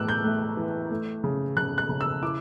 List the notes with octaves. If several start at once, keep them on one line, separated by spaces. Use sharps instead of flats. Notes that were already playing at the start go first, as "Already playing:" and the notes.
Already playing: A2 E3 D6 E6 F#6
G6
A3
E3
A3
C#3
C#3 F#6
F#6
C#3
E6
E4 D6